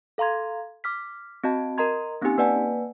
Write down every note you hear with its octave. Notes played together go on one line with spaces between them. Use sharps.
A4 F5 A#5 C6 G#6
D6 F6 B6
C4 F#4 D#5 A5
A#4 D#5 A#5 C6 G#6
A#3 C4 C#4 D#4 G4 G#5
A#3 B4 D5 F#5 G#5 A5